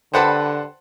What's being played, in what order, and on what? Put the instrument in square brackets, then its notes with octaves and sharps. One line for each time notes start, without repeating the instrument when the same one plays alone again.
[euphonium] D3 [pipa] G3 A4 B4 [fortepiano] C5 F#5 A5